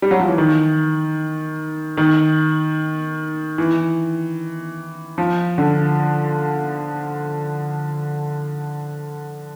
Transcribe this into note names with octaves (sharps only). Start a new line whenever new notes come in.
G3
F#3
F3
E3
D#3
D#3
E3
F3
D3